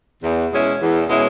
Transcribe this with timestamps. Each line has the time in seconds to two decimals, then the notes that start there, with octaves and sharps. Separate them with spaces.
0.23 E2
0.52 B2 G#3 C#4 E4
0.81 E2
1.09 B2 G#3 C#4 E4